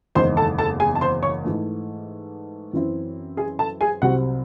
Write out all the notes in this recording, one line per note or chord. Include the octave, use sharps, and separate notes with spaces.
F#1 E2 D#3 G#3 C5 C6
A4 A5
A4 A5
G#4 G#5
A5
C5 C6
C#5 C#6
G#2 E3 A3
F#2 E3 C4 E4
G#4 G#5
A4 A5
G#4 G#5
C2 C3 F#3 C4 F#4 F#5